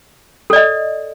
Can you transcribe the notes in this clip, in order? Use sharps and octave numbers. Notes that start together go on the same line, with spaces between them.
A4 D5 D#5